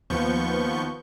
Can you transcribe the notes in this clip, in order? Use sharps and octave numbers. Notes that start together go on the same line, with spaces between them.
D#2 F3 B3 C#6 G6